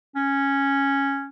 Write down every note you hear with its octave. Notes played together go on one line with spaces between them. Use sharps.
C#4